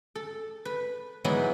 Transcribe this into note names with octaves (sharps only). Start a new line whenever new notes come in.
A4
B4
E3 F#3 G#3 B3 D#4 E4